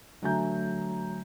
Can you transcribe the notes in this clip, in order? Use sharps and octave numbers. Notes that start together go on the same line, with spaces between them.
D3 F#3 A3 G#5 A#5 G6